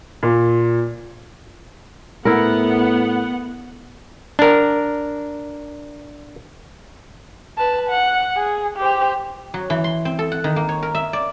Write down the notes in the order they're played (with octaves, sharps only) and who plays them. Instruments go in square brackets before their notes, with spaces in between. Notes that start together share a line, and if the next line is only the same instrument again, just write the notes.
[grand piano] A#2
[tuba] A2 [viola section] B3 F#5 [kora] E4 A#4
[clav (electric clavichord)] D4 A#4
[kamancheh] B4 A5
F#5
G#4
G4 C5
[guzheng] F#3
E3
C6
C4
A4
F#5
D#3
A#3
C#5
A#4
E5
D5